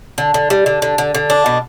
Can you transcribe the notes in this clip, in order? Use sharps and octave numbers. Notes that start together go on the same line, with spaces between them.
D3
D3
G3
D3
D3
D3
D3
D4
B2